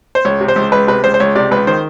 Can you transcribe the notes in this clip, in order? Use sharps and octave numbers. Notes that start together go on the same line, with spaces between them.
C5
C#2 C#5
C3
C5
C#2
C#2 B4
C3 B4
C#2 C5
C5
C#2 C#5
C3 D5
C#2 B4
D#3 C5